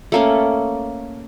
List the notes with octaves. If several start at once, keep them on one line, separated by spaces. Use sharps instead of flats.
A3 A#3 C#4